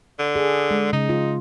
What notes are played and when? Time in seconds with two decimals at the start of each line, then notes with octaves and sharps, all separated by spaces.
0.19 D3
0.36 G#4
0.71 G#3
0.93 C#3 D#4
1.09 F4